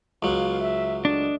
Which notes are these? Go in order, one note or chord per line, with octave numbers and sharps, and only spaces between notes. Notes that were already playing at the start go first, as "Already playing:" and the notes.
C#2 F#3 B3 F5
E5
A3 D4 D#5